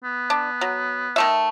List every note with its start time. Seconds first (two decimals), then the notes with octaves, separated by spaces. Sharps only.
0.04 B3
0.30 D4
0.61 F#3
1.16 D#3 A3 E5